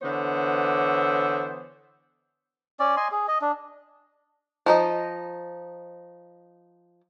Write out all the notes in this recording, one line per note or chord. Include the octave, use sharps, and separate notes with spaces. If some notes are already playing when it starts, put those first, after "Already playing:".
D3 E3 B3 C5 C#5
C#4 D5
D#5 G#5 C6
G#4
D#5
D4
F3 D#4 D#5